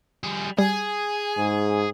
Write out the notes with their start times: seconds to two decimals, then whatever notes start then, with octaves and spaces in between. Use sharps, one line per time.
0.23 G3 G#4
0.59 G3 G#4 G#5
1.38 G#2